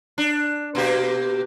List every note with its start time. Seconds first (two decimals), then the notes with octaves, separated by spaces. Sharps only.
0.18 D4
0.75 B2 A#3 G4